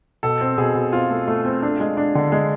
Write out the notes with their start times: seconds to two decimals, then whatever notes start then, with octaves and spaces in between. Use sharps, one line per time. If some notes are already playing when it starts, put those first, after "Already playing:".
0.23 B2 A4
0.41 C4
0.58 B2 G#4
0.75 B2
0.93 C4 F4
1.10 A3
1.28 A3
1.45 C4
1.63 D4
1.80 G#3
1.97 D4
2.15 D3
2.32 G#3